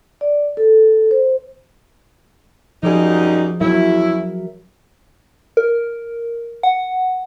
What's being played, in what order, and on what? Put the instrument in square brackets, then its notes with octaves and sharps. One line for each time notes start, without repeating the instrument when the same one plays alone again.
[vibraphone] D5
A4
C5
[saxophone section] F#2 G3 D#4 [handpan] F3 G#4
[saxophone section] E2 C#4 E4 [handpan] F#3 A#4 E5
[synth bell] A#4
F#5